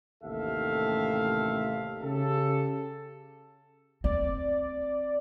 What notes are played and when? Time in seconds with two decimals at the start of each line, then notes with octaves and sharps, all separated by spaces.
0.24 A1 D#2 C3 A4 E5 F5
2.02 C#3 G4 A4
4.04 C4 D5